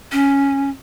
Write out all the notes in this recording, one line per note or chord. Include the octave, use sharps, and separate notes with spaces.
C#4